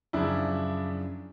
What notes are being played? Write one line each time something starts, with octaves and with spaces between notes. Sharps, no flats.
F#2 C#3 F3 D4 E4